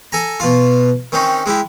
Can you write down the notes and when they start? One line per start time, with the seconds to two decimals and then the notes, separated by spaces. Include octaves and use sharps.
0.12 A4 G#5 A#5
0.40 B2 F4
1.12 D#3 C4 C#4 D#4
1.46 G#3 E4 G4